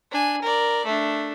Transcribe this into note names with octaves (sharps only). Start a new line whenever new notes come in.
D4 G#5
A#4 D5
A3 D4